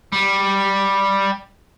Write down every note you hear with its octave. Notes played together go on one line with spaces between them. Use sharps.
G3